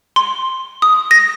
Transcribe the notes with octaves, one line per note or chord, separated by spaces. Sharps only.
C6
D#6
A#6